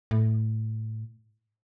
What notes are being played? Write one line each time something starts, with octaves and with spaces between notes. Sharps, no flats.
A2